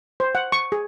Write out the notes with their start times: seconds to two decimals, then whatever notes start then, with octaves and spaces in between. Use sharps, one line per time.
0.20 C5
0.35 F#5
0.52 C#6
0.72 G#4